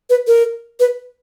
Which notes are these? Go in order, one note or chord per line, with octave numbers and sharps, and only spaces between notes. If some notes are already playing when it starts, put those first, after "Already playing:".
B4
A#4
B4